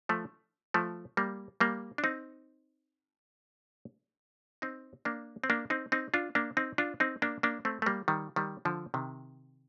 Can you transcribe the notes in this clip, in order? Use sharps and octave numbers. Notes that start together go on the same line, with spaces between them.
F3 A3
F3 A3
G3 A#3
G3 A#3
D4
C4 D#4
C4 D#4
A#3 D4
C4
A#3 D4
C4 D#4
C4 D#4
D4 F4
A#3 D4
C4 D#4
D4 F4
C4 D#4
A#3 D4
A#3 D4
A3 C4
A3
G3 A#3
D#3 G3
D#3 G3
D3 F3
C3 D#3